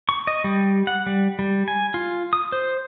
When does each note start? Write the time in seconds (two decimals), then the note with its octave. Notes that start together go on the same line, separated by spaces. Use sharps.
0.09 C#6
0.27 D#5
0.44 G3
0.87 F#5
1.06 G3
1.39 G3
1.68 G#5
1.94 F4
2.33 D#6
2.52 C5